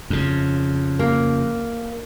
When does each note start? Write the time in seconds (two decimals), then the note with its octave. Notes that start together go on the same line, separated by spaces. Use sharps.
0.10 F2 C#3
0.99 A#3